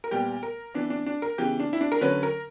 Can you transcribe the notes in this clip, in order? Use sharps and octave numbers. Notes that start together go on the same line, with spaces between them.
A#4
A#2 G3 B3 G4
A#4
E3 B3 D4
D4
D4
A#4
C#3 E3 B3 G4
D4
E4
D4
A#4
D3 F#3 C#4 B4
A#4